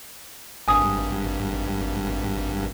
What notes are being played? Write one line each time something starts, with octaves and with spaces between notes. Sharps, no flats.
G#1 G2 G#5 D#6